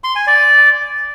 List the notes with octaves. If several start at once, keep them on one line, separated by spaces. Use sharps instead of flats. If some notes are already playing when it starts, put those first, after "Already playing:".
C6
G#5
D5